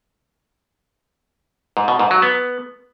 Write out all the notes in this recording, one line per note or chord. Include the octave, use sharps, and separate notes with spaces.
G#2
B2
G#2
F#3
B3